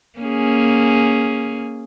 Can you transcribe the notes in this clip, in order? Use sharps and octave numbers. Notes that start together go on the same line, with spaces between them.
A#3 C#4 G#4